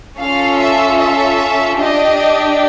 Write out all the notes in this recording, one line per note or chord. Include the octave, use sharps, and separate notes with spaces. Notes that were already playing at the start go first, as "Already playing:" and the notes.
C#4 F4 A4 F5
E5
E5
D4 G4 D#5